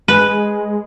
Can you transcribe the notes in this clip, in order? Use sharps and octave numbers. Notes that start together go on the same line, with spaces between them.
G#3 B4